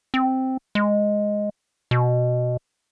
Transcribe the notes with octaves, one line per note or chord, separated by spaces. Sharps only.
C4
G#3
B2